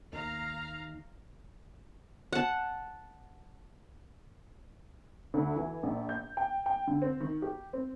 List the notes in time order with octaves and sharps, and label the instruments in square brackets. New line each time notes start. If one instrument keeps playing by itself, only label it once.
[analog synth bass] D#2 [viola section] F5 A#5
[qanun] F#5 A5
[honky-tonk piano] D2
E3
A#1
G6
G5
G5
D3
C4
D#3
G4
C4